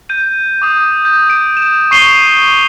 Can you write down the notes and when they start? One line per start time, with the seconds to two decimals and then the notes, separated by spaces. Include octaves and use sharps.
0.09 G6 D#7
0.62 D6 D#6
1.05 G6
1.30 D7
1.57 E7
1.91 C#6 D6 C7 D#7 F7 G7